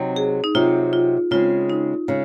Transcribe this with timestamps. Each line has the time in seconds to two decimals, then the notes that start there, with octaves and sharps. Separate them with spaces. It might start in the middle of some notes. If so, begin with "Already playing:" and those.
Already playing: C3 F#3 C4 D#4
0.16 G#4
0.44 D#4
0.55 C3 F#3 C4 D#4 F4
0.93 F4
1.31 C#3 G#3 C4 F4
1.70 D#4
2.08 C#3 G#3